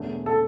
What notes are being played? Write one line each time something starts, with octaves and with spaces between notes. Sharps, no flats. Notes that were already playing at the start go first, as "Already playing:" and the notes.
Already playing: E1 E2 D3 A3
A4